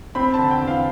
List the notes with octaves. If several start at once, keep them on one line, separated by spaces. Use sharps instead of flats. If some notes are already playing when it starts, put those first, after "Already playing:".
C4 B5
A5
D3
G5
E2
F5